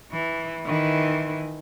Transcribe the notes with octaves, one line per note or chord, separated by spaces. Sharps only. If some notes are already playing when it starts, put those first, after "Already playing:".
E3
D#3 E3